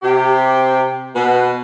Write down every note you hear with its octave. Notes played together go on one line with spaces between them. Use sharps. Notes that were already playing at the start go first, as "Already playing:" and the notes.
C3 G4
B2 B4